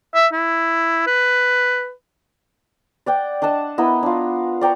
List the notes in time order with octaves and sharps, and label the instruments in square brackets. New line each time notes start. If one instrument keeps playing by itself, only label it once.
[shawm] E5
E4
B4
[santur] D5 F#5 G5
D4 D#5 F#5 A5
B3 E4 A#4 D#5
D4 F4
D5 G5 A#5 C#6